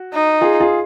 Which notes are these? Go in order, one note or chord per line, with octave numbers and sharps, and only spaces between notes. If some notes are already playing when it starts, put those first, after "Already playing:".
Already playing: F#4
D#4
F4 G#4
F4 G#4